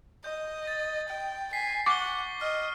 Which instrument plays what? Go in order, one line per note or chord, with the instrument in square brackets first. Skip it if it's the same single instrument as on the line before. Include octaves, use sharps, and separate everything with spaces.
[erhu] D#5 [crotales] G6
[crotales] A6
[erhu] G5
[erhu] G#5 [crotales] B6 C7
[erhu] F#5 [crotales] C#6 G7 [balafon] D6
[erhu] D#5 [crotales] F6